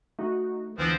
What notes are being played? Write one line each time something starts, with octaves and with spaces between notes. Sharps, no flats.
A3 D#4 F#4
D2 E3 F3 B3 C4